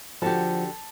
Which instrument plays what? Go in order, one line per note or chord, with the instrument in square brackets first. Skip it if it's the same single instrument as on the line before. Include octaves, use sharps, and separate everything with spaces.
[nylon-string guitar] D3 F#4 G4 [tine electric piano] F3 [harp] A5